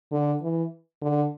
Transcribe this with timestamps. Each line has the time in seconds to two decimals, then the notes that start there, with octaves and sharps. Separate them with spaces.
0.12 D3
0.42 E3
1.02 D3